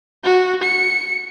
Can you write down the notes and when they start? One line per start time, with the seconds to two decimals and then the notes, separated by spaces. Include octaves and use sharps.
0.24 F#4
0.63 C#7